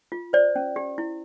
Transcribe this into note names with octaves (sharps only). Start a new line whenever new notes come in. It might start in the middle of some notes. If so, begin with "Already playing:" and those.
F4
C5 D5
C#4
G4
E4